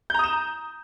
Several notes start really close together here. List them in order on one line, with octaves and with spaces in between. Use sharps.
G6 A#5 D#6 E7